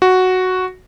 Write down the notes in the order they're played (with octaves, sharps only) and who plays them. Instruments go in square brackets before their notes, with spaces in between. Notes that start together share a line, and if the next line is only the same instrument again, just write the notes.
[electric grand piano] F#4